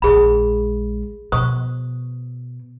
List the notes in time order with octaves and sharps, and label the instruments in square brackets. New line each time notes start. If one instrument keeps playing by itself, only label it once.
[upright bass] A#1 G#3 [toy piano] G#4 B5
[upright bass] B2 [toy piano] C5 C#6 D#6